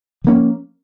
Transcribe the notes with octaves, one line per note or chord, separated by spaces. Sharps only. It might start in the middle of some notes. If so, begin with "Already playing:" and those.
F3 A#3 C#4